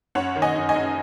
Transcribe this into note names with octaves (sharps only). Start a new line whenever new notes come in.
F#2 C#5 F#5
D#3
D#5 G#5
F#2
D#5 G#5
F#2